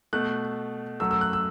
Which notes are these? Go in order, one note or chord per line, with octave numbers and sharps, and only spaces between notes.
B2 A3 F#6
F#2 F#3 A3 E6
E6
F#6
E6